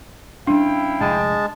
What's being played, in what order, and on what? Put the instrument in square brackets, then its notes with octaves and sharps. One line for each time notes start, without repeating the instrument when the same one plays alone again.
[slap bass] G3 C#4 [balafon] D4 [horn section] E4 F5 G5
[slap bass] F1 F2 D3 [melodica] G#3 A5